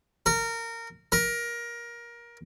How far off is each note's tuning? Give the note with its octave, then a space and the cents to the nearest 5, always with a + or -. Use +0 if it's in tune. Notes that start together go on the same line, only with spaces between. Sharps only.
A#4 -20
A#4 +20